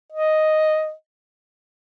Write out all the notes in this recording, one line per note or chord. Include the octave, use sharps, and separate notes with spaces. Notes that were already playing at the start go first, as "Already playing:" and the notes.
D#5